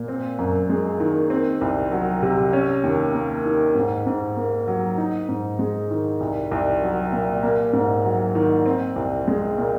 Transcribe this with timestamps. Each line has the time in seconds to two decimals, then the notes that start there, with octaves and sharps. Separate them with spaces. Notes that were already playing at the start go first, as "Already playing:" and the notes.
Already playing: A#2
0.08 C4
0.39 F#2
0.69 G#3
1.00 D#3
1.30 C4
1.61 C2
1.91 F#3
2.23 C3
2.53 C#4
2.84 D#2
3.14 A#3
3.45 D#3
3.75 G#2
4.07 G#2
4.37 A#3
4.67 F#3
4.98 D#4
5.29 G#2
5.59 G#3
5.91 D#3
6.20 C2
6.51 C2
6.82 F#3
7.13 A#2
7.43 A#3
7.73 G#2
8.04 F#3
8.35 D#3
8.66 C4
8.96 C2
9.28 G#3
9.58 A#2